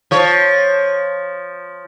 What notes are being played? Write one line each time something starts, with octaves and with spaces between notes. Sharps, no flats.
F3 C#5